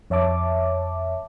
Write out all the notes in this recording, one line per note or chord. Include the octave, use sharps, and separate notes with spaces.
F2 C#5 E5 A5 D6